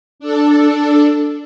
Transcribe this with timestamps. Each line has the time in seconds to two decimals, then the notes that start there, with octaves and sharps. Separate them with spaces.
0.19 D4 A4